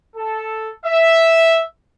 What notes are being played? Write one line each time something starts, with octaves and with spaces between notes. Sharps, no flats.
A4
E5